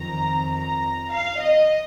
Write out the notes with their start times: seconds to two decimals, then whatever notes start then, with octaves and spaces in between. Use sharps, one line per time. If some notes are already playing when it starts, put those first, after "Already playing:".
Already playing: F2 D#3 A#5
0.51 A#5
1.11 F5
1.40 D#5